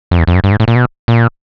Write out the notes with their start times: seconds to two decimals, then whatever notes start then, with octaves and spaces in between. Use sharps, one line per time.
0.11 F2
0.19 E2
0.27 F2
0.35 F#2
0.44 G2
0.52 G#2
0.60 A2
0.68 A#2
0.76 B2
1.08 A#2